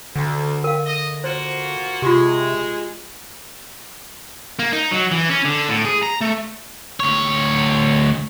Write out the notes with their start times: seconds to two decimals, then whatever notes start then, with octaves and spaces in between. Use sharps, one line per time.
0.16 D2 D3
0.64 A#4 F5
0.86 D#5
1.24 A#3 F4 F#4 C5
2.02 C3 G#3 F4 G4
4.59 A#3
4.73 D#4
4.91 F#3
5.11 E3
5.29 C#4
5.45 D3
5.69 A2
5.85 G#4
6.03 A#5
6.21 A3
7.00 D2 C#5